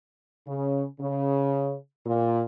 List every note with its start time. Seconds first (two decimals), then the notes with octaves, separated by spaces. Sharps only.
0.47 C#3
1.00 C#3
2.06 A#2